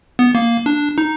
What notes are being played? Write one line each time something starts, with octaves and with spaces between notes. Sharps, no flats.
B3
A#3
D4
D#4